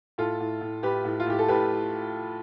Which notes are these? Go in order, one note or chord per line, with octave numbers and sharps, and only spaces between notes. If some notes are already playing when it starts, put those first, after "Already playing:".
A2 F4 A4
A2
A2
A2 G4 B4
A2
F4
A2 G4
A4
A2 G4 B4